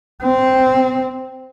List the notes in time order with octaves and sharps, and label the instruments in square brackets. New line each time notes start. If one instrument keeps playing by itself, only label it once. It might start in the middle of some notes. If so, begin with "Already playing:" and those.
[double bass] C4